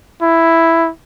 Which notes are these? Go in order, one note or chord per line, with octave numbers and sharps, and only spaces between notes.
E4